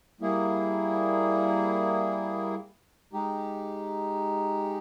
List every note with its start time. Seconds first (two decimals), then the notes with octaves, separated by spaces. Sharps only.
0.21 G3 A#3 E4 G#4
3.13 G#3 D#4 G4